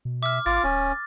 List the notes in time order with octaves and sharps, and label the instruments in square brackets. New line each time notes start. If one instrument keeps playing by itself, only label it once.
[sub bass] B2
[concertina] E5 [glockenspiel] D6 F6
[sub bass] A1 [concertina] F4 D6 [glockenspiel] A6
[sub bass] D1 [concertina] C#4